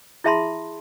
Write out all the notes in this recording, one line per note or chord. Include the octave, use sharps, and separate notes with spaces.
E4 G#4 E5 A5 B5 C6